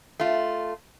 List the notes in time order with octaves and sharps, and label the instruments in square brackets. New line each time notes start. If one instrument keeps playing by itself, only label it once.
[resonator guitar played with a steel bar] A3 F4